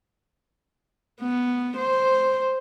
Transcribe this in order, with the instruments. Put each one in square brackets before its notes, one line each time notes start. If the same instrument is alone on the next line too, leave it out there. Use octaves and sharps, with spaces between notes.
[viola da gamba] B3
C5